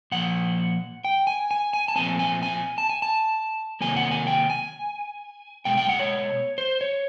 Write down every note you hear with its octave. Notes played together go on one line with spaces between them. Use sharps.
A#2 F3 F#5
G5
G#5
G#5
G#5
A5
A#2 F3 A3 C4 G#5
G#5
G#5
A5
G#5
A5
C3 D#3 F#3 A#3 G#5
F#5
G#5
G5
G#5
B2 G#3 G5
G5
F#5
C#5
C5
C#5